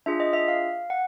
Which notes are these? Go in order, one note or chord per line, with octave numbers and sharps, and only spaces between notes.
D4 F4 G#4 E5
D#5
E5
F5
F#5